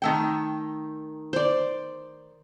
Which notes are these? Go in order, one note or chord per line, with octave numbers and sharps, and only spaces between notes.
D#3 A3 G5
C5 D5